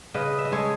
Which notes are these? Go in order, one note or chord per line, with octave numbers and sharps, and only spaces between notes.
C#3 B4 D#5
E5
D#5
G#3 A4 C#5